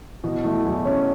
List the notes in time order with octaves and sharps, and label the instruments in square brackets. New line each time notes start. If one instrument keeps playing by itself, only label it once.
[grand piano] B2 [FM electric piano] E3 E4
[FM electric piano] E3 E4 [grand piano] A3
[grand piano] E2 [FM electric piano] F#3 F#4
[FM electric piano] E3 E4 [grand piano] C#4